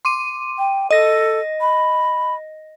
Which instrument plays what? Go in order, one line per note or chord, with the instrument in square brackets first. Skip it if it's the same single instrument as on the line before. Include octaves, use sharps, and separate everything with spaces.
[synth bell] C6 D6 D#7
[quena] G5
[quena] A4 [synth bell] D#5 A#6
[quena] B5